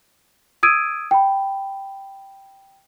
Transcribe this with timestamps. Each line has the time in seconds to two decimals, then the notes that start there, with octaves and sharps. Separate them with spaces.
0.63 D#6 E6 G#6 D7 D#7
1.11 G5 B5